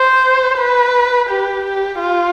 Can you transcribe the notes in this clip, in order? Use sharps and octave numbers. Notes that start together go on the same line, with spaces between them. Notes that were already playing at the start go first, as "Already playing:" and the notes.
Already playing: C5
B4
G4
G4
F4